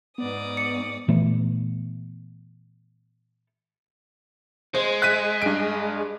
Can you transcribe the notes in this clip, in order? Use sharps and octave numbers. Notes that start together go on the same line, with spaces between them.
G#2 B3 D5 D#6
C#7
A#2 E3 A3 B3
G#3 C5
F#6 B6 D#7
G2 D7